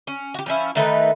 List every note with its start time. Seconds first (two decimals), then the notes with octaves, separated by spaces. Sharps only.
0.07 C#4
0.34 F#4 G4
0.46 F3 C#4 E4
0.75 D#3 A3 D#4 B4